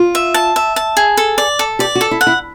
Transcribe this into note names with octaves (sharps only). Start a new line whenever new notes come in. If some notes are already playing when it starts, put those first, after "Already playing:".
Already playing: F4
E5
A5
E5
A5
G#4
A4
D5
A4
G4 D5
F#4
A4
E4
F#5
E4